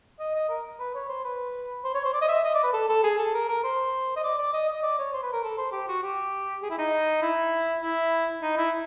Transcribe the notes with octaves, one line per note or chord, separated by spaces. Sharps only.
D#5
D#5
A#4
B4
C#5
C5
B4
C5
C#5
C5
D5
D#5
E5
D#5
D5
B4
A4
A4
G#4
A4
A#4
A#4
C5
D#5
D5
D5
D#5
D#5
D5
C#5
C5
B4
A#4
A4
C5
G4
F#4
G4
G#4
E4
D#4
E4
E4
D#4
E4